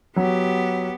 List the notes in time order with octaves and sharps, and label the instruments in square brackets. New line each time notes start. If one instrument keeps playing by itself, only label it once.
[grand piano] F#3 [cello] B3 G4